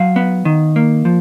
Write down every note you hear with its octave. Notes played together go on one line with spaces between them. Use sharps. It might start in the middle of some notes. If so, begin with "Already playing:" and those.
Already playing: F#3 F5
B3
D#3
A#3
F3